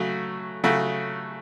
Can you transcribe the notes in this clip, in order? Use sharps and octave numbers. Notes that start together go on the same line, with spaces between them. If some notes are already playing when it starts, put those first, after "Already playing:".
Already playing: C#3 F#3 A3 F#4
C#3 F#3 A3 F#4